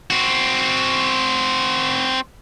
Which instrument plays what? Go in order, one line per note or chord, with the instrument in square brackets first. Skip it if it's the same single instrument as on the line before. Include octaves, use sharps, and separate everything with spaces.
[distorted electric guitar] C4 F#4